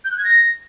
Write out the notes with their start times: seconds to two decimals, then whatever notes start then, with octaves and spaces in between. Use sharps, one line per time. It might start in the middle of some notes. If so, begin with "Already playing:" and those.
0.05 G6
0.11 F#6
0.18 G#6
0.24 A#6